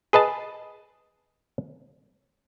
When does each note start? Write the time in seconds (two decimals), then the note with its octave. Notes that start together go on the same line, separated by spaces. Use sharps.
0.13 G#4 B4 D#5 A5